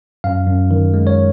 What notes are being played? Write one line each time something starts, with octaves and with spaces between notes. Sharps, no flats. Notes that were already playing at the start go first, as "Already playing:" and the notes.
F#2 F5
F#2
D#3
G#3
C#5